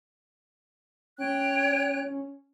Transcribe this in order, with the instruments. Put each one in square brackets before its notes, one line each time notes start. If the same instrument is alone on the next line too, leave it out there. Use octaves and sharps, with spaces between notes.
[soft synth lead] C#4 [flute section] C#5 G5 F#6